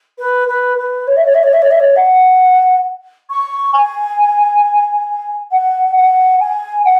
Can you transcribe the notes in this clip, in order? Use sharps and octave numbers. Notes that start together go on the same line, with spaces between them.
B4
B4
B4
C#5
E5
C#5
E5
C#5
E5
C#5
E5
C#5
F#5
C#6
G#5
F#5
F#5
G#5
F#5